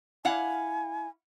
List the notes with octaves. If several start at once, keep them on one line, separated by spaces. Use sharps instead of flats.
E4 F5 F#5 G#5